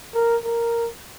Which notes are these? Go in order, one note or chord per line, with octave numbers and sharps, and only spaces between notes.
A#4
A#4